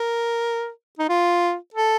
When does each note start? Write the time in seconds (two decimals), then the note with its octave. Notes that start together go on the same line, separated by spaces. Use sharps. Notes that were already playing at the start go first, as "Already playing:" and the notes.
Already playing: A#4
0.99 D#4
1.09 F4
1.74 A4